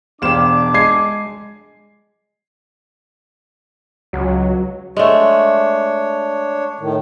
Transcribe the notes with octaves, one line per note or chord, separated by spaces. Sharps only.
E1 D4 G4 C5 F5 D6 E7
G#3 G#6 C7
C#2 F#3
G#3 A3 D4 C#5
A2 D#3